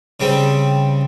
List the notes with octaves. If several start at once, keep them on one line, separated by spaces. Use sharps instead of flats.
C#3 G3 C4